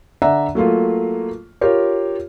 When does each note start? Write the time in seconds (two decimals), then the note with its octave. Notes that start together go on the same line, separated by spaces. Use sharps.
0.22 D3 D5 E5 F#5 A#5
0.55 F#3 A3 A#3 F4
1.61 F4 G4 A#4 C#5